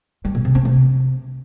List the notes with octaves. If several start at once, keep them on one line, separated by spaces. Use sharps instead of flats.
G3
A#2
C3
C4
C3